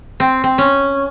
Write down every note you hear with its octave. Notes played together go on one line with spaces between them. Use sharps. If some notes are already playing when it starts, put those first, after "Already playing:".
C4
C4
C#4